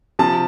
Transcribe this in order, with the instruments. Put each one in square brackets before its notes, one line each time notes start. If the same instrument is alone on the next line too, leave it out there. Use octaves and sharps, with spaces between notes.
[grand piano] C3 F3 A5